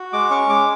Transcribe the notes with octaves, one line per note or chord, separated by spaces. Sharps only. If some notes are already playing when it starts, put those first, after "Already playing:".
Already playing: F#4
G#3 D6
C#4 C#6
G#3 D6